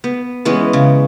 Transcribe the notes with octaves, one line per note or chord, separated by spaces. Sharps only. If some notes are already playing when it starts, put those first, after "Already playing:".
B3
E3 G#3 B3 C#4
C#3